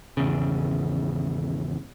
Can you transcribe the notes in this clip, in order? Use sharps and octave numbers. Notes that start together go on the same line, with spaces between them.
G#1 E2 C#3